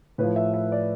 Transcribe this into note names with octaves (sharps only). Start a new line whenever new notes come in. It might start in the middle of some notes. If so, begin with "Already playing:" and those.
A2 F3 B4
E5
E5
D5